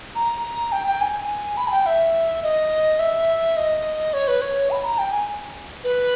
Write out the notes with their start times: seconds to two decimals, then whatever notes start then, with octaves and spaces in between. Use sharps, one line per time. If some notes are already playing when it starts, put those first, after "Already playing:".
0.15 A#5
0.72 G5
0.87 G5
1.01 G#5
1.57 B5
1.68 G#5
1.71 G5
1.86 E5
2.43 D#5
2.99 E5
3.57 D#5
4.13 C#5
4.28 B4
4.41 C#5
4.71 B5
4.84 A#5
4.98 G5
5.12 G#5
5.84 B4